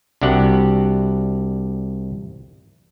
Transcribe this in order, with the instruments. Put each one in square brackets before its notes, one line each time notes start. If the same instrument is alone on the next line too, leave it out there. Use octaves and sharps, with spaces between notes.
[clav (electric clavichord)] C2 D4 F#4 G4 F#5